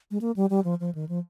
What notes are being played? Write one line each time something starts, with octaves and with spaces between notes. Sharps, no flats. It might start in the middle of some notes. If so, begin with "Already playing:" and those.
G#3
A#3
G3
G3
F3
F3
D#3
F3